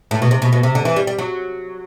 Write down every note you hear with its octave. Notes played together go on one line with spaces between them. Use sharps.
A2
B2
C3
B2
B2
C3
D3
E3
G3
G3
F#3